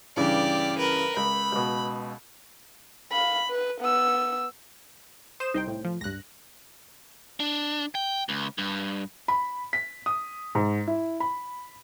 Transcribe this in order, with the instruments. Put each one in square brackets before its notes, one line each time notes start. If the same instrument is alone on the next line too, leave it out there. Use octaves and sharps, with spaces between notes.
[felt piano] G2 C#3 E3 [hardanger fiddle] G4 D5
[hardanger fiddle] A#4 B4
[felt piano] C#2 [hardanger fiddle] B5
[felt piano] C#2 B2
[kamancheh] F5 B5
B4
B3 E6
[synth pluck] C5 [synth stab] D#6 E7
[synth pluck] C2 [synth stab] D#4 C5 G5
[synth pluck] A2
[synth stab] F3
[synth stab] C#2 G2 [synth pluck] F#6 A#6
[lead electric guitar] D4
G5
C#2
G2
[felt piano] B5
B6
D#6
G#2
E4
B5